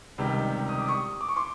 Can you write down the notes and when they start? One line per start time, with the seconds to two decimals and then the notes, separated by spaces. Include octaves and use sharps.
0.18 C#2 C3 D#3 G3
0.69 D#6
0.79 D6
0.88 C#6 D#6
1.21 D6
1.28 C#6
1.36 C6 D6